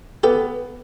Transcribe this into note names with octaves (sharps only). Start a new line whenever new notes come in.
B3 G4 A4